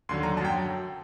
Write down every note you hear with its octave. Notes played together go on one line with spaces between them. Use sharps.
D#2 D3 F#3 C6
A#5
F#2 F#3 G5 A5